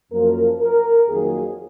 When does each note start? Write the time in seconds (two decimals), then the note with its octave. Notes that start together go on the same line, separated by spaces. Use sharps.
0.11 F#2 F3 A#3 A#4
0.60 A#4
1.07 F2 D#3 F#3 A#3 G#4